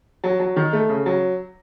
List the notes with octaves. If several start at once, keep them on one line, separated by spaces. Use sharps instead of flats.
F#3
F#3
D#3
A3
C#3
F#3